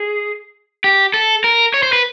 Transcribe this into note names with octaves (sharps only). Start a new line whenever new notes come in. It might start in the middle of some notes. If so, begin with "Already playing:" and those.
Already playing: G#4
G4
A4
A#4
C#5
C5
B4